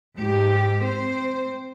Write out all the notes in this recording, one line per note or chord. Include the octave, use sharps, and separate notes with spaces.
G#2 G4
C4 C5